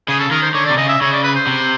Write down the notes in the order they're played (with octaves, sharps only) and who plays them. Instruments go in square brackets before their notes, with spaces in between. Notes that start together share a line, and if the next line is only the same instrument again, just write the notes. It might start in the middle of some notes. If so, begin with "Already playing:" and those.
[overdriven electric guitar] C#3 [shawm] G#4
[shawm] A4
[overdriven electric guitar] D#3 [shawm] A#4
[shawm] C5
[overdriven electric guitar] D3 [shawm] C#5
[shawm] D5
[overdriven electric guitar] C3
[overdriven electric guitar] C#3 [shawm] D#5
[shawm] E5
[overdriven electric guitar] C#3 [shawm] C#5
[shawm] D5
B4
C5
[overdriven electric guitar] C3